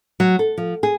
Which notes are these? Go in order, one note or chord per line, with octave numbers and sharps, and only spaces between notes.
F#3
A4
F3
G#4